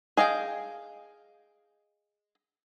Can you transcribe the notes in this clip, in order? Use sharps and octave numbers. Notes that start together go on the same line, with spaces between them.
G#4 D#5 F5 G5